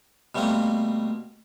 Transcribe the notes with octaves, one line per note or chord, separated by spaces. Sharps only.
B2 G3 A3 A#3 C4